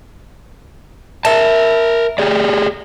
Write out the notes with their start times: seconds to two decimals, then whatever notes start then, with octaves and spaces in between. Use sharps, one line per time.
1.25 A#4 E5 A5
2.18 G4 G#4 D5